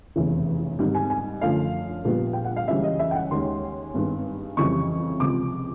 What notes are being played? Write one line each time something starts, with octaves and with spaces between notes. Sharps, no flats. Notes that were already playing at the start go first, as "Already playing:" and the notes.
F1 E2 C#3 E3
G#1 G#2 D#3 G3
G#5
G#5
F#2 D3 F3 A3 F5
A#1 A#2 G3 B3
G5
F#5
F5
C#2 C#3 E3 G3 E5
D#5
E5
G5
F#5
D#2 D#3 G#3 C#4 C6
G#1 G2 D#3 G#3 B3
F2 C#3 E3 G3 C#6
C#2 C3 F3 D6